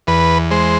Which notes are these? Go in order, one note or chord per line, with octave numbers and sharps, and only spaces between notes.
E2 B4
G#3 C5